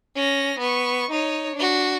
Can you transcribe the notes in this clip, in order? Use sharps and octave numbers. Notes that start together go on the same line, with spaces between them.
C#4 A#6
B3 C#6
D#4 C#5
D4 F#4